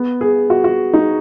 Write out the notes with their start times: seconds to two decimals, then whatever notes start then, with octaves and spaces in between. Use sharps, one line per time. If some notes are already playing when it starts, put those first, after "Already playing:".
Already playing: B3
0.21 G#4
0.50 F#4
0.64 F#4
0.93 D#4